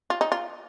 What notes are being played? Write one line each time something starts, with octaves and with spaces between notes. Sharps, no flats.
F4
D#4
F4